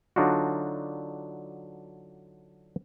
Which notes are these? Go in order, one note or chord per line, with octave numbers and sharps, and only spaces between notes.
D3 F#3 D4 D#4 F4 F#4